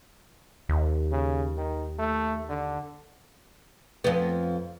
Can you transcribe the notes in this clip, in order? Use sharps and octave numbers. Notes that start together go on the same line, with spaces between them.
D#2
C#3
D#3
A3
D3
F2 B3